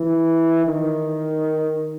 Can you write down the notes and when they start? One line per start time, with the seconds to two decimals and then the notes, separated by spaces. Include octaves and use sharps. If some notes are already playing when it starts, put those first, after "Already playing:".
Already playing: E3
0.67 D#3